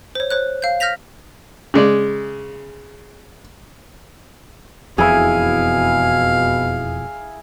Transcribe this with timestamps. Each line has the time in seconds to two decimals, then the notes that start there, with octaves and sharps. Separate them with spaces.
0.15 C5 C#5
0.30 C5 C#5 F#6
0.62 F5 G6
0.80 F6 G6 A#6 B6 F7
1.74 C#3 G#3 D5
4.98 E1 F2 B2 E3 E4 G#4 F5